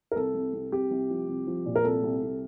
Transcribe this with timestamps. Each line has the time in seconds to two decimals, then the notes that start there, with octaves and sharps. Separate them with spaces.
0.12 A#4
0.16 C2 A4
0.35 C2
0.53 C2
0.72 C2 G4
0.91 C2
1.10 F3
1.29 C2
1.47 F3
1.66 A#2
1.76 A#4
1.84 C2 A4
2.03 C2
2.22 C2